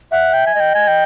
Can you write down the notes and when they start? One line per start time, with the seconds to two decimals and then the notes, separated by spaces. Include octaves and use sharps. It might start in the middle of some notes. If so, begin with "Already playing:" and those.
0.12 E5 F#5
0.33 G5
0.47 G#5
0.55 D#5
0.60 G5
0.74 G#5
0.88 G5